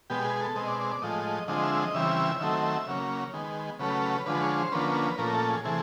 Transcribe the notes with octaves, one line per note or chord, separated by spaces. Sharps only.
B2 G#3 B3 G4
G#4
A4
B2 G#3 C4 D#5
D5
D5
D5
A2 F3 G#3 D#5
D3 F3 G#3 C4 D#5
E5
D#5
C#3 E3 G3 C4 E5
D#3 F#3 A3 C4 E5
E5
C#3 F#3 A#3 C#4
D#3 G#3 B3
C#3 F#3 A3 C#4 B4
D3 F3 G#3 B4
C#5
C5
D3 F3 A#3 C#4 B4
A#2 F3 A3 C#4 A#4
A4
G#4
C3 E3 A3 G#4